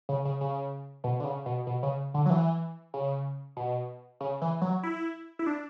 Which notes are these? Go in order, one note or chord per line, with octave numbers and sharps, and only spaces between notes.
C#3
C#3
C#3
B2
D3
C#3
B2
B2
C#3
D3
F#3
E3
C#3
B2
C#3
E3
F#3
E4
E4
D4